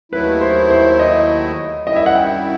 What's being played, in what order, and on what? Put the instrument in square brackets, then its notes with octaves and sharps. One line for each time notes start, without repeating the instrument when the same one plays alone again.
[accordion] D#2 D#3 F#3 A3 E4 [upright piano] B4
[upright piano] C5
C5
D#5
[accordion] F#2 D#3 G3 C4 E4 [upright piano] D#5
[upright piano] E5
F#5
G5